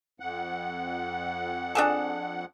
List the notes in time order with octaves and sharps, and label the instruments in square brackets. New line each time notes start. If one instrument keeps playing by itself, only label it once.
[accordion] F2 F#5
[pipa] D4 G#4 A4